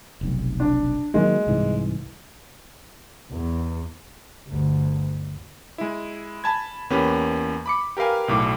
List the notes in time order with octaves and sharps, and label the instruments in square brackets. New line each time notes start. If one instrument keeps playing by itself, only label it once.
[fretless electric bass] F1 B1
[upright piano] D4
[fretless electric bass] D#3 F#3 A#3 [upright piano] G#3
[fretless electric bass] C2 G#2 E3
[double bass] E2
G1 D2
[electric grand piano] G#3 E4
G#5 A5 B5 G#6
E2 A#3 C#4 G4 B4
B5 D6 C#7
G4 A#4 B4 F5 G#5
B1 A2 D6